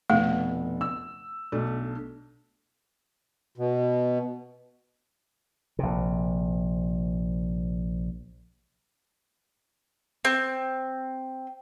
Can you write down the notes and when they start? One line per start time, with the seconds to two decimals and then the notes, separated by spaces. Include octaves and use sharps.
0.10 F1 B2 A3 F#5
0.81 E6
1.52 B1 A3 D4
3.58 B2
5.79 A#1 C3
10.25 C4